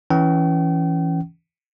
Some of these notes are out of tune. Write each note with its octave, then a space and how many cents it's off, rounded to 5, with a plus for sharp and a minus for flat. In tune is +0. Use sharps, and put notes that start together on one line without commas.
E3 +0 C#4 +0 G5 -40